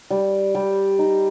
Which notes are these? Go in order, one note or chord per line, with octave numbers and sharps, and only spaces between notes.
G3
G3
D#4